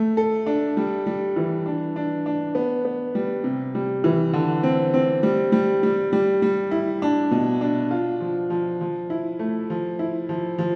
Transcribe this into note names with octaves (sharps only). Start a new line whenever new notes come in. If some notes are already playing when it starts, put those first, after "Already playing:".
Already playing: A3
A4
D4
G3
G3
E3
D4
D4
D4
B3
B3
G3
C3
G3
E3
D3
C4
C4
G3
G3
G3
G3
G3
E4
D4
B2
D4
F4
F3
F3
F3
E4
A3
F3
E4
F3
F3